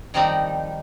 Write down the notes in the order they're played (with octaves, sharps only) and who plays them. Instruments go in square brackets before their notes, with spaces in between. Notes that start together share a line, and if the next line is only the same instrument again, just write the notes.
[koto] D#3 F3 G3 C4 D#4